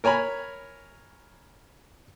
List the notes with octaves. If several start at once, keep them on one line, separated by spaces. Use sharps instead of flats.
A#4 C#5 G#5 A#5 B5